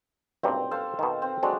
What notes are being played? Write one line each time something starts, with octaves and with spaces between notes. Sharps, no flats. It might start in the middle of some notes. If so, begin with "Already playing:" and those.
B1 G2 A#2 C4
A4 C5 F5
B2 D#3
C4
F#3 G#3 C4 D4 A4